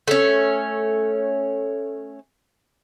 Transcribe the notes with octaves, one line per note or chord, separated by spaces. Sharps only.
A3 C#4